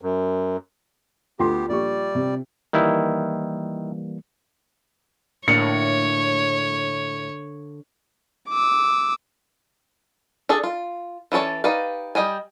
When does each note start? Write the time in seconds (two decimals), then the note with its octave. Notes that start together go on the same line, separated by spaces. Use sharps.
0.02 F#2
1.39 D2 B3 F4 G4 G5 C6
1.69 A#1 G3 G4 D5 C#6
2.15 C3
2.73 D#3 E3 G3 A#3 E4
5.48 A2 D3 A#3 D4 C#5 C#7
8.50 D6 E6
10.49 D4 G#4 A4
10.64 F4
11.32 E3 C#4 A4 C#5 D5
11.64 D#4 G4 B4 D5 F5
12.15 G3 D#5 G5 G#5